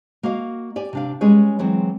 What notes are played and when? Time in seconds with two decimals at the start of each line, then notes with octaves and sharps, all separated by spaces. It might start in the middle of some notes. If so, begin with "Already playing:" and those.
0.23 A#3 F#4 D#5 F5
0.76 G4 D5 G#5
0.93 C3 D4 F5
1.21 G3 G#3 C#4 G#4 B4 C#5
1.59 E3 F#3 G#3 C4